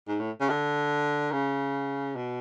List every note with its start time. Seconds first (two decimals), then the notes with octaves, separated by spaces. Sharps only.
0.08 G#2
0.20 A2
0.40 C#3
0.50 D3
1.32 C#3
2.16 B2